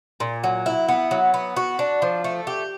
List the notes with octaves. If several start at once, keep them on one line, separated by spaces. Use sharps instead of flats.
A#2
F#3
E4
B3
F#3
B3
F#4
D4
F3
A3
G4